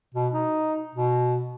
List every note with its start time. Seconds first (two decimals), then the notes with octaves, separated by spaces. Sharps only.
0.14 B2
0.33 D#4
0.95 B2